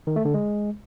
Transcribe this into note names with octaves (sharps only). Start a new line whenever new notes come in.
D#3
A3
D3
G#3